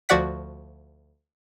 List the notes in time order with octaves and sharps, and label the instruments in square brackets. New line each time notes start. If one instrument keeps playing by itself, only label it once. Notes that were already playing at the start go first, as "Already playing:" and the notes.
[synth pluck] D2 F3 F#4 D5 F#5 B6